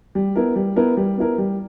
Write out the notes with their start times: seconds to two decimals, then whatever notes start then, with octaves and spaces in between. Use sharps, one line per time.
0.15 G3
0.36 B3 E4 A#4
0.56 G3
0.76 B3 E4 A#4
0.97 G3
1.18 B3 E4 A#4
1.38 G3